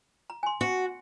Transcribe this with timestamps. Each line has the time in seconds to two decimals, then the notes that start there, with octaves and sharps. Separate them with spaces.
0.30 A#5
0.43 G#5 C6
0.61 F#4